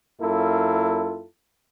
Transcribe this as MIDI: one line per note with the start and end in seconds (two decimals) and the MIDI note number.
0.21 1.25 42
0.21 1.25 58
0.21 1.25 64
0.21 1.25 65
0.21 1.25 69